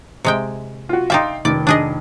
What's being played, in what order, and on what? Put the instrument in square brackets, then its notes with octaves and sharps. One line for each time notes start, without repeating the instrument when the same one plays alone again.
[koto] C3 G#3 G5
[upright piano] F4 F#4
[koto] D#4 D5 E5 [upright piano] F5 G5 C6
[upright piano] F1 D#3 [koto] D5
[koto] D4 G#4 D#5